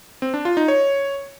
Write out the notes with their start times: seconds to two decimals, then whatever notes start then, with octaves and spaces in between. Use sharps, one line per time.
0.22 C4
0.34 D4
0.45 F4
0.57 D#4
0.68 C#5